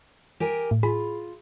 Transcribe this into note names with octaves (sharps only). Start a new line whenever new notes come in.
G4 A#4 G#5
A2
F4 G#4 B5